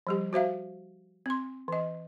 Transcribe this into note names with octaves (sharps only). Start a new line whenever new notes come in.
F3 G3 G4
F#4 C5 E5 F5
C4 C6
E3 D#5